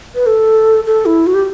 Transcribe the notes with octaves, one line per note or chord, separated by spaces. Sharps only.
B4
A4
A4
E4
F#4
G4